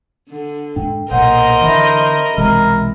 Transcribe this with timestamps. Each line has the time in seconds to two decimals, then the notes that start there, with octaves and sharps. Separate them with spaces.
0.29 D3
0.76 G#2 D4 G5
1.11 B1 A#2 A#4 C5 D#5 F#5
1.61 D3 E3 E5 B5 A#6
2.38 B1 C3 E3 G#3 A#4